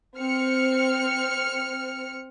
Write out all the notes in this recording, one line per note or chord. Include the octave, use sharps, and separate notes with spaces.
C4 F6 C#7